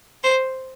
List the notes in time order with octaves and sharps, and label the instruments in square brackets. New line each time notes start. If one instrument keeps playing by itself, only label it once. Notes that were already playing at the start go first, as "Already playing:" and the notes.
[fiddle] C5